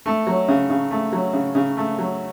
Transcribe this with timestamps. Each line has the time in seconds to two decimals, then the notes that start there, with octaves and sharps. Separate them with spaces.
0.06 A3
0.27 F#3
0.48 C#3
0.70 C#3
0.91 A3
1.12 F#3
1.33 C#3
1.55 C#3
1.77 A3
1.98 F#3